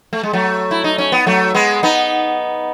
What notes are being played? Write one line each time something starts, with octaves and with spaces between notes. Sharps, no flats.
A3
G#3
F#3 A3
E4
D#4
C#4
B3
F#3 A3
G#3 B3
B3 D#4